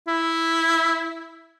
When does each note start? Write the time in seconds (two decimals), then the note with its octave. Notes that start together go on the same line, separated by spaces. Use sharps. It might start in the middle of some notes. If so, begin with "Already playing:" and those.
0.08 E4